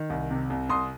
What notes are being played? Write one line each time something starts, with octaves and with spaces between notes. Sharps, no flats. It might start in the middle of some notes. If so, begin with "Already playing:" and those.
Already playing: D#3
C2
C3
C2
C2 C6 D#6